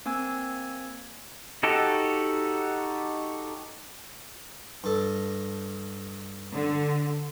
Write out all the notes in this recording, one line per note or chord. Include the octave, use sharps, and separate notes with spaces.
A#3 C4 G#5 E6 G#6
D#4 F#4 G4 A4
G2 A4
D3